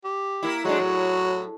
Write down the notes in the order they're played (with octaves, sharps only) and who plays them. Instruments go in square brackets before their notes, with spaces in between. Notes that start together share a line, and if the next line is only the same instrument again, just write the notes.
[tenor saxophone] G4
[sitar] A#3 E4
[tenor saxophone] F#3 [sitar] G#3 A3 D4
[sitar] A2